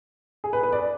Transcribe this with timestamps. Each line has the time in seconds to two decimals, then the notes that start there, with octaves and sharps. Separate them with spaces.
0.44 G#4
0.53 B4
0.63 B4
0.73 D5